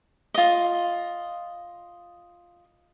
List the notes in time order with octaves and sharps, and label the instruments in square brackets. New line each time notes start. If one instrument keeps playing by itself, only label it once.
[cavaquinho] F4 D#5